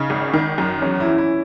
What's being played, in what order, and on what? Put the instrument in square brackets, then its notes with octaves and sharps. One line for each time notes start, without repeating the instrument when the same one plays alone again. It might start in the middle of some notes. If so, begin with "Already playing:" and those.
Already playing: [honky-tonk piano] C#3 [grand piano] D#4
[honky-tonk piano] G#1
D#3
F#2
[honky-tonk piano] E2 [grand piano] C#4
[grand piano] E4
[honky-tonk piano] E3
[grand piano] E4